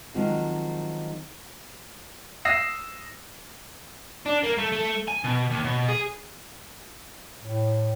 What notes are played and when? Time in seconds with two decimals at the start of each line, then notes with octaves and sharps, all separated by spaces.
0.14 D#3 F3 F#3 G#3 C4 F4
2.45 D#6 E6 A#6 C7 E7
4.26 D4
4.43 A#3
4.58 A3
4.72 A3
5.08 G#5
5.24 B2
5.50 D#2
5.64 B2
5.88 G#4
7.41 A2